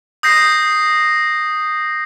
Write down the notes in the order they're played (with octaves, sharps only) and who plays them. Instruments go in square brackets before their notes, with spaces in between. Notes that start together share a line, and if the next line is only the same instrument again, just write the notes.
[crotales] D#6 G6 A#6 C7